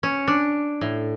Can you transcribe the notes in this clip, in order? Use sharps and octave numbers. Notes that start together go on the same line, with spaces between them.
C#4
D4
A2